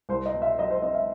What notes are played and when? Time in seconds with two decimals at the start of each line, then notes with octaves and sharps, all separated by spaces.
0.09 C2 C5
0.26 D#5
0.34 B2
0.42 E5
0.59 F#3 D#5
0.71 C5
0.82 C4 D#5
0.95 E5